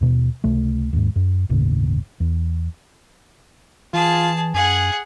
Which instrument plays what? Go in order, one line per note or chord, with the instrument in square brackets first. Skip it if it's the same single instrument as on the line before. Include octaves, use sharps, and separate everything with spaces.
[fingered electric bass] D#2 B2
C#2 C3 A3
D#2 G#2
F#2
G1 D#2 A2 C#3
E2
[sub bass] E3 [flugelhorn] F4 [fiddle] G#4 A5
[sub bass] F#2 [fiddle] G#4 F#5 [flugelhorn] G#5